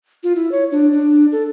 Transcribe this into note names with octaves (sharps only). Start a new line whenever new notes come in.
F4
E4
C#5
D4
D4
A4